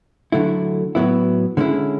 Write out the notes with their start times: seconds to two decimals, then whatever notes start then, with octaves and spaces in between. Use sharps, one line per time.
0.32 D3 F#3 A3 E4
0.95 A2 F#3 B3 E4
1.57 D3 G#3 C#4 E4